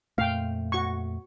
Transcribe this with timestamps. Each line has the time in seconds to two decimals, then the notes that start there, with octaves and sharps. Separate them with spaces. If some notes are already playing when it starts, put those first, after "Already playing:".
0.18 F2 A#2 A3 F5 G5
0.72 F#4 C#6